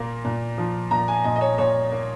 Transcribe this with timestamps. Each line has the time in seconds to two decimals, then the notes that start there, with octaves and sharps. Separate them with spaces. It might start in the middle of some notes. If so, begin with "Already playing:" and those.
Already playing: A#2 A#3
0.25 A#2
0.58 F3
0.91 A#2 A#5
1.08 G#5
1.24 A#2 D#5
1.36 D#5
1.41 C#5
1.58 A#2 C#5
1.91 A#3